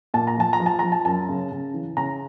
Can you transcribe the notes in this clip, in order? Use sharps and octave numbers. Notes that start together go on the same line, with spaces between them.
A#2 A5
A#5
F3 A5
A#5
F3
A5
F3 A#5
A5
F#2 A5
C#3
C#3
E3
C#3 A#5